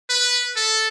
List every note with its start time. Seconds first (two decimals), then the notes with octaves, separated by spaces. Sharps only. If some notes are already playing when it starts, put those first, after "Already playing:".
0.09 B4
0.56 A4